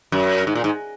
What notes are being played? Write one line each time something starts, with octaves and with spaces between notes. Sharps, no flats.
F#2
G#2
A#2
G#2